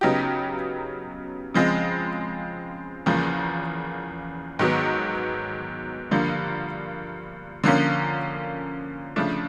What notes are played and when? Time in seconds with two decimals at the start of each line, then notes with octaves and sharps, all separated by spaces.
0.01 C#3 F#3 B3 D#4 G4
1.54 C#3 F3 G#3 C4
3.06 E2 C#3 F3 A#3
4.59 G#2 D#3 F#3 B3
6.11 G2 D3 F3 A#3
7.64 D3 F3 A#3 C#4
9.16 C#3 F3 A3 D4